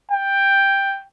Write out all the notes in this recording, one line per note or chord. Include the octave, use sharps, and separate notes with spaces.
G5